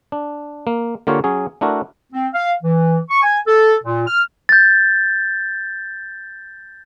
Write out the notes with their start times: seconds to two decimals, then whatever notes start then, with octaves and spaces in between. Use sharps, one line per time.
0.12 D4
0.67 A#3
1.07 D3 A#3 F4 G4 C#5
1.24 F#3 C#4 G#4
1.61 A3 D4 E4 F#4 A#4
2.13 C4
2.34 F5
2.63 E3
3.10 C#6
3.23 G#5
3.47 A4
3.84 A#2
4.07 F6
4.49 G6 A6